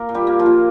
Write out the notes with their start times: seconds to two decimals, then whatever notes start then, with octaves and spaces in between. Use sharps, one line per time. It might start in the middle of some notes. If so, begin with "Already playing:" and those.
Already playing: A#3 A#4
0.09 A#2
0.15 G3 G4
0.27 A#3
0.39 F3 F4
0.46 A#2